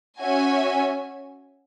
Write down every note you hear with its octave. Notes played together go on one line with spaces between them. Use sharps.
C#4 F#4 E5 G#5